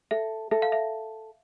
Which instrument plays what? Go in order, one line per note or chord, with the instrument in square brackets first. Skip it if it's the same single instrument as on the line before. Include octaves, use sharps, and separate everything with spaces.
[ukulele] A4 [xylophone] E5
[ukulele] A4 [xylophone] E5
[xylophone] F5
E5